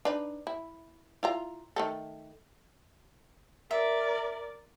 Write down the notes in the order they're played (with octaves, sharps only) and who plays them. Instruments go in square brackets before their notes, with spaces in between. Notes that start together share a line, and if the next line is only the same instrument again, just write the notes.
[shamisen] D4 D#4 B4
E4
E4 F4 A#5
D#3 A3 A4
[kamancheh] A#4 D5 [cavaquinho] E5